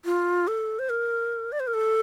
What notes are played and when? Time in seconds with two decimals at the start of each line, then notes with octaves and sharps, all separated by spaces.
0.05 F4
0.48 A4
0.79 C5
0.89 A#4
1.52 D5
1.60 C5
1.67 A#4
1.74 A4